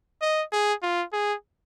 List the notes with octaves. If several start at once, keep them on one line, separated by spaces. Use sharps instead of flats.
D#5
G#4
F4
G#4